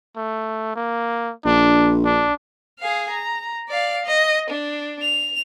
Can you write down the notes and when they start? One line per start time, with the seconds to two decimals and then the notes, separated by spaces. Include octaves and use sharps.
0.16 A3
0.76 A#3
1.45 A#1 D4
2.05 D4
2.79 G#4 F5
3.10 A#5
3.68 D5 F5
4.05 D#5
4.50 D4
5.02 F7